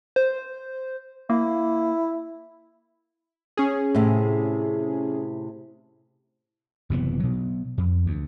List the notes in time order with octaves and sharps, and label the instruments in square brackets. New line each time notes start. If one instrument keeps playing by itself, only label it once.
[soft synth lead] C5
[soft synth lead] A#3 [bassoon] E4
[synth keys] C#4 G#4
[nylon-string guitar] A2 C3
[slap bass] F#1 C3 E3 B3
B2 F#3
F2
D2